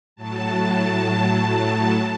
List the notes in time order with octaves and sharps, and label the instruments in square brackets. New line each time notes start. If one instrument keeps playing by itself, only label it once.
[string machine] A2 F#3 A5